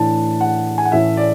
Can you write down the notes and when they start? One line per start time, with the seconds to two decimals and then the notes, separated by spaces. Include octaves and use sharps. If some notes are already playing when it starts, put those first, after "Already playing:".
Already playing: A2 E3 A3 D4 A5
0.41 F#5
0.78 G#5
0.85 F#5
0.92 A2 E3 A3 C#4 E5
1.17 D5